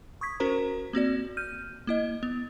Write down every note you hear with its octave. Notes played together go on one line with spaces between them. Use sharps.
C#6 D#6 G#6 B6
C#4 F#4 A#4 C5 A#5
A#3 C4 F#4 D5
F6 G6 D#7
A#3 E4 D#5
B3